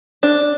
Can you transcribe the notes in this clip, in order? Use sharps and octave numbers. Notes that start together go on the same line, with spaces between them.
D4